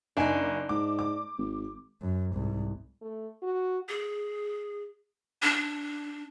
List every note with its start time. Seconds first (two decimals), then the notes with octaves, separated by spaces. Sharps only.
0.17 F#1 D4 D#4 G#5
0.69 G#2 D6
0.99 D6
1.38 G#1
2.02 F#2
2.34 C2 G#2
3.02 A3
3.42 F#4
3.89 G#4
5.42 D4